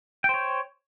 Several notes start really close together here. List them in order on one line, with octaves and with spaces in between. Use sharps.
G5 C5 C#5